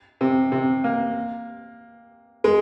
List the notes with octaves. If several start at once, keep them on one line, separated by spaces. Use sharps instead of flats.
C3
C3
A#3
G#3